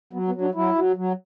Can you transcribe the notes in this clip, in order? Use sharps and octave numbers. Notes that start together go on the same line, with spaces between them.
F#3 B3
B3
F#3
D4
F#3 E4
F#3
F#3